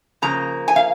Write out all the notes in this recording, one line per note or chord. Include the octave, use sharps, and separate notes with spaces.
C#3 F3 A#3 A#5
G#5
F5